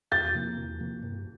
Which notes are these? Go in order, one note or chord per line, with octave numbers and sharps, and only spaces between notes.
E2 G6 A6
C3 F3 A#3
E2
C3 F3 A#3
G2